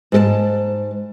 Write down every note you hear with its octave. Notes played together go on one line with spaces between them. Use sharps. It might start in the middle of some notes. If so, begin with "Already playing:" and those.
G#2 A4 A5